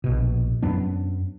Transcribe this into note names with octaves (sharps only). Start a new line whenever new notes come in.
A#1 B2
F#2 F#3 B3 D4